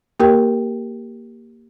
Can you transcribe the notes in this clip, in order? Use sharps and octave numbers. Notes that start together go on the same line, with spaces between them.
A#3 G4 A#4 G5